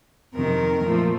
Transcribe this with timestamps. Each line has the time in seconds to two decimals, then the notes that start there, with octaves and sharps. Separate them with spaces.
0.33 F2 C3 D#3 A#4
0.83 A#2 F3 A3